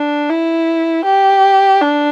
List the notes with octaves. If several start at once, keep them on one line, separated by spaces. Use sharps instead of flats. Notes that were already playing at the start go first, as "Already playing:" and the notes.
Already playing: D4
E4
G4
D4